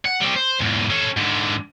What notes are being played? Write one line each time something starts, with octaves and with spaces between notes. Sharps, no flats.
F#5
G3 C4
C5
E2 G#2
C#4 A4
G#2 D3